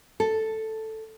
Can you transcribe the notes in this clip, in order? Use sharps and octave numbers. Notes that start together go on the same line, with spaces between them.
A4